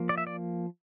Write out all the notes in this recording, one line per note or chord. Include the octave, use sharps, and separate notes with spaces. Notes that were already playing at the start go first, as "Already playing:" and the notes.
Already playing: F3 A#3
D5
E5
D5